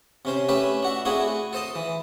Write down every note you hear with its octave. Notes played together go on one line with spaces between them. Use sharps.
C3 C#4 C5
A3 C#4 G4 B4 E5
D4 F#4 E5
A3 C4 D4 E4 F#4 G#4
A4 C5 D#5 A5
E3